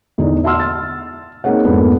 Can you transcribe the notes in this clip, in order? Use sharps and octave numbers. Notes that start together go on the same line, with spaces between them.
E2 D3 D#4
E5 F#5 A5 C6 E6 F6
A6
A#3 C4 D#4 G#4 C#5 F#5
F2 G#2 A#3 B3 D4